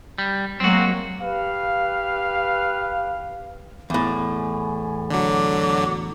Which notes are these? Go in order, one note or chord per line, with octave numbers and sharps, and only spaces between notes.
G3
F#3 G#3 A#3 C4 F#4
G4 B4 F5
E2 A2 G#5
D3 F#3 D6